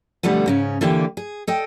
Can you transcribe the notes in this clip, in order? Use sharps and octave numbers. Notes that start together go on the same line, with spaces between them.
B2 D3 F3 G3 A3 B3
G#2 C#3 C#4
D3 E3 A#3 G4
G#4
A4 D#5 G5